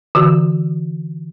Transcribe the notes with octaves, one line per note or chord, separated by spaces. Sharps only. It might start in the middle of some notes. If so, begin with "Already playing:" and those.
D3 E3 F#4